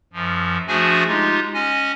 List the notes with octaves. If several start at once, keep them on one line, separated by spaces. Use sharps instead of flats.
F#2 F3
F3 A3 D4 F#4 G#4 G#5
G#3 D#4 F4 G4
C#4 D#5 G#5